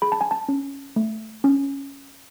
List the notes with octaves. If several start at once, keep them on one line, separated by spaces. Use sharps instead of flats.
G#4 B5
A5
G#5
A5
C#4
A3
C#4